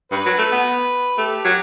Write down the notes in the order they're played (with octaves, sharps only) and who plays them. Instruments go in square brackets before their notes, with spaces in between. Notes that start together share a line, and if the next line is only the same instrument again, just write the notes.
[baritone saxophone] G2 [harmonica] B4
[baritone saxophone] F#3
A3
B3
[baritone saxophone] A3 [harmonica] G4
[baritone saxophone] F#3